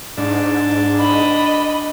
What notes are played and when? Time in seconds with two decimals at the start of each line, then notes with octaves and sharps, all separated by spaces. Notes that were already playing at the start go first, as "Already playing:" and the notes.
0.18 G#2 D4
0.98 D#5 B5